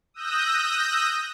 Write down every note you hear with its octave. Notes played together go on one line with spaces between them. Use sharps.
D#6 E6 F#6 G6 A#6